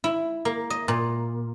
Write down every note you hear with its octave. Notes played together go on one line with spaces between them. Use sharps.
E4
A#3
D#5
A#2